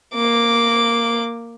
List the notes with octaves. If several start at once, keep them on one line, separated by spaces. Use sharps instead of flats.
A#3 D6